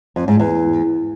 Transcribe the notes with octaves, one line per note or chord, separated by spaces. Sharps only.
F2
G#2
E2